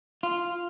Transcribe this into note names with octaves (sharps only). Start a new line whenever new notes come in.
F4